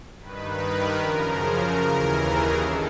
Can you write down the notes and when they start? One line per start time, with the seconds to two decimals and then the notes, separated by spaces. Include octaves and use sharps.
0.20 G2 D#3 B4
0.60 A#4
0.98 F#2 C#3 F3 A#4
1.77 D#2 C#3 E3 A#4
2.16 G#4
2.56 G2 D#3 A4